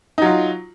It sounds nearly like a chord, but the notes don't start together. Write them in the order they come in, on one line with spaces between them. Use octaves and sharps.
D#4 F#3 F4